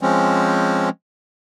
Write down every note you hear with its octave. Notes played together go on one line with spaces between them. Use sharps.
F3 G#3 C4 C#4